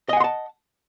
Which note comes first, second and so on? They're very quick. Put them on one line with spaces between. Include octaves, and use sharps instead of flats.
D#5 G#5 F#5 C6 A5